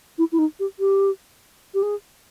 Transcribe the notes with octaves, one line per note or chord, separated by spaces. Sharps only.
E4
E4
D#4
G4
G4
G4
G#4